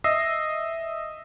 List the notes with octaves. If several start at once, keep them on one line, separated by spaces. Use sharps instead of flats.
D#5 E5 D#6 E6 A#6 C7